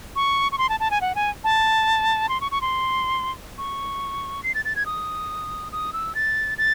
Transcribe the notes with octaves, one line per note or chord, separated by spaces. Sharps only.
C#6
C#6
C6
A5
A5
G#5
F#5
G#5
A5
C6
C#6
C#6
C6
C#6
C7
A6
A6
G#6
D#6
D#6
E6
A6
A6